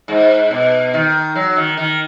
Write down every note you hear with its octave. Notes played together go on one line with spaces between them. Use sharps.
G#2
B2
D#3
F#3
D#3
D#3